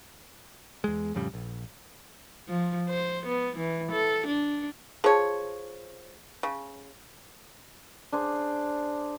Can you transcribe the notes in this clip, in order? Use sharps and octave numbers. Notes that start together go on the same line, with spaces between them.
E2 G#3
F2 A2 C#3 G3
A#1
F3
C5
B3
E3
A4
D4
F3 G#4 C#5
C#3
D4 G#4 C5